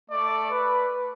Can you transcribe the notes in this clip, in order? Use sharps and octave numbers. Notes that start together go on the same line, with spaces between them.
A3 A4 D5
B4